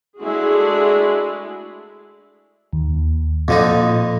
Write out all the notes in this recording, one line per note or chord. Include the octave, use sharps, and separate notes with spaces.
G#3 A3 D4 E4 F#4 G#4
D#2
F2 A#2 D3 D#4